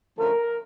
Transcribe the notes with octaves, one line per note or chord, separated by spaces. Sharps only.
D3 F3 A3 C#4 A#4